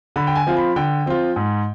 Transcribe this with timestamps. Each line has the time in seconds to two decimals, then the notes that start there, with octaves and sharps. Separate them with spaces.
0.16 D3 B5
0.27 G5
0.35 G#5
0.47 F3 C4 F4
0.57 B5
0.76 D3 G5
1.06 F3 C4 F4
1.36 G#2